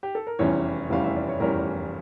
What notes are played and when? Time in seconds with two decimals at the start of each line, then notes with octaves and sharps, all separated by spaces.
0.03 G4
0.15 A4
0.27 A#4
0.39 F1 E2 E3 G3 C#4 C#5
0.89 F1 E2 E3 G3 C#4 F5
1.04 E5
1.16 D5
1.29 C#5
1.40 F1 E2 E3 G3 C#4 A#4